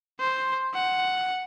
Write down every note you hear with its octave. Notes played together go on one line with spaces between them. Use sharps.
C5
F#5